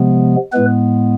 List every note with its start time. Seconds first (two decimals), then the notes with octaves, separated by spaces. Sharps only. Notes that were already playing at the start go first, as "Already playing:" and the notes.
Already playing: C3 F3 G#3 B3
0.52 A2 G#3 B3 B4